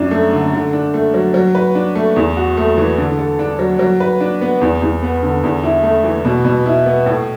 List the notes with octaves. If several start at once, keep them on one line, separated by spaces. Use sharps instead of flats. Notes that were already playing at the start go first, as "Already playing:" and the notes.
Already playing: F#2 F#3 D4
A3
D3
D3
D4
A3
F#3
F#3
B4
D4
A3
E2
F#4
A3
E3
D3
A4
D4
F#3
F#3
B4
D4
B3
E2
E2
B3
D3
E2
E4
A3
E3
B2
B2
E4
B3
A2